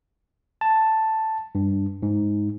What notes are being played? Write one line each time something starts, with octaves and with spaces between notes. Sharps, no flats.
A5
G2
G#2